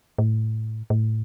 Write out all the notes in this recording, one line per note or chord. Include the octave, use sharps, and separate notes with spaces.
A2
A2